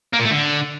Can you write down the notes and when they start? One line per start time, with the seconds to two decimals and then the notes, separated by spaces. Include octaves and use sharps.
0.13 A#3
0.19 A#2
0.25 A3
0.31 D3